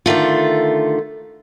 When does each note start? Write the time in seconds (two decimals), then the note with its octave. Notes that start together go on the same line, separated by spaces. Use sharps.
0.06 D3 D#3 A3 F4